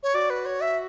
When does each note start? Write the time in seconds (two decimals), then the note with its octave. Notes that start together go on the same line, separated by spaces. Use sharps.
0.03 C#5
0.15 F#4 D5
0.30 B4
0.45 C#5
0.61 E5